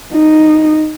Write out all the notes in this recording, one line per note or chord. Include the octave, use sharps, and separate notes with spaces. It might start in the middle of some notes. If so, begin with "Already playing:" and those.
D#4